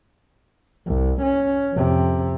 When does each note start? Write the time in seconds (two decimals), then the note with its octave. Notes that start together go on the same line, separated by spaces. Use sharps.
0.86 C2
1.23 C#4
1.73 F2 C3